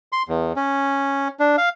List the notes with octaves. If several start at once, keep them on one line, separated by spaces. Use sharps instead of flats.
C6
E2
C#4
D4
F5